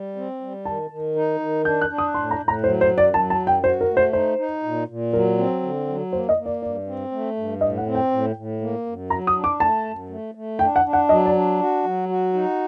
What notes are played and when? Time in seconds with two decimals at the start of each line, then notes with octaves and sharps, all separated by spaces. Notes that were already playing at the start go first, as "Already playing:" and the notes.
Already playing: G3
0.16 C4
0.41 G3
0.65 D#3 A5
0.90 D#3
1.16 D#4
1.40 D#3
1.65 D4 G6
1.82 F#6
1.90 D4
1.98 D#6
2.14 A2 C6
2.31 A#5
2.39 A2
2.48 A#5
2.64 F#3 C5
2.81 C5
2.89 F#2
2.98 D5
3.14 F#3 A5
3.30 A5
3.39 F#2
3.47 G5
3.64 F#4 C5
3.81 A#4
3.89 A3
3.97 C5
4.13 D#4 C5
4.38 D#4
4.63 A#2
4.88 A#2
5.13 F#3 A#4
5.38 C4
5.63 D3
5.88 F#3
6.12 A#3 C5
6.29 D#5
6.37 A#3
6.46 D5
6.62 G2 D5
6.87 C4
7.12 A3
7.37 G2
7.61 A2 D#5
7.78 F#5
7.86 C4
7.95 G5
8.11 A2
8.36 A2
8.61 A#3
8.86 F#2
9.10 F#3 A#5
9.27 D#6
9.36 D4
9.44 D6
9.60 A3 A5
9.85 F#2
10.10 A3
10.35 A3
10.59 D4 G5
10.76 F#5
10.85 D4
10.93 F#5
11.09 F#3 D#5
11.26 D5
11.35 D4
11.59 F#4
11.84 F#3
12.09 F#4
12.34 D#4